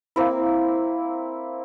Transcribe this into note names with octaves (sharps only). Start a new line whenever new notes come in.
A#3 C4 E4